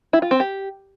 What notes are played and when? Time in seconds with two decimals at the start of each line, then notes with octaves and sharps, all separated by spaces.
0.13 E4
0.22 F4
0.31 C4
0.40 G4